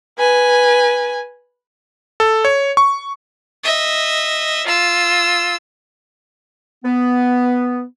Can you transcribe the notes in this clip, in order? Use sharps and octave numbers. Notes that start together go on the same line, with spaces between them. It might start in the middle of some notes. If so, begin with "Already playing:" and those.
B4 G#5
A4
C#5
C#6
D#5 E5
F4 E6
B3